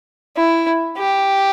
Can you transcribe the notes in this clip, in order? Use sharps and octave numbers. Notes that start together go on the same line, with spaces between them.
E4
G4